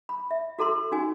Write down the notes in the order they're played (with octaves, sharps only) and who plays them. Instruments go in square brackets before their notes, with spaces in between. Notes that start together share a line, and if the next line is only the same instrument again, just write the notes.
[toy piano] B5
E5
F#4 A4 A#5 C6 E6
C#4 D#4 F#4 G#5